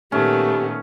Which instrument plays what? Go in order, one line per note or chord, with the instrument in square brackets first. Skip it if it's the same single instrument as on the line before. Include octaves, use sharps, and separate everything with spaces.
[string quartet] A#2 D#3 B3 [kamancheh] A3 [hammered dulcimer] C#4 [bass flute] G4